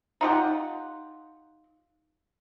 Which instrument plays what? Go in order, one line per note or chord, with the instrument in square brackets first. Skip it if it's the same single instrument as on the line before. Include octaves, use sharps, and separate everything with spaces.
[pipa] D#4 F4 G4 F#5